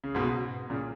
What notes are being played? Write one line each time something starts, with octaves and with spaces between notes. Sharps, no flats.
C#3
G#2 B2
A#2 C#3